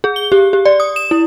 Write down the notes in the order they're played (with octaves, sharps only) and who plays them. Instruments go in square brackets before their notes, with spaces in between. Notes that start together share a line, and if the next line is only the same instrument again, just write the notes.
[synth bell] G#4
G7
G4
G4
D5
D#6
E7
E4